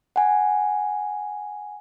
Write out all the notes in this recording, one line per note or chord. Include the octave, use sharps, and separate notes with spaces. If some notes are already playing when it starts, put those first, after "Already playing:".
F#5 G#5